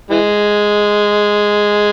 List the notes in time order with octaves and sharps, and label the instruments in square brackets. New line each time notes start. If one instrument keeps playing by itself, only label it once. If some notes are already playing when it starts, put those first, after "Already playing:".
[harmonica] E3 G#3